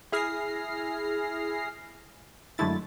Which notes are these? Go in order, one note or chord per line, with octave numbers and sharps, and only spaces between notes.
E4 G#4 F6 A#6 C7
F#2 D3 G#3 A3 E4 A6